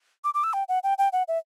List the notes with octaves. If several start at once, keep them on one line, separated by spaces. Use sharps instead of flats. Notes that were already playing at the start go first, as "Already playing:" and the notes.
D6
D6
E6
G5
F#5
G5
G5
F#5
E5